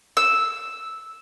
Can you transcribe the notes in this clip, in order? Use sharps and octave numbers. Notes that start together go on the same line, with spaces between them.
E6